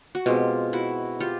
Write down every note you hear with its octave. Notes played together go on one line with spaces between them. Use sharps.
F#4
B2 G#3 C4 F4 G4
E4 F#4
F4 G4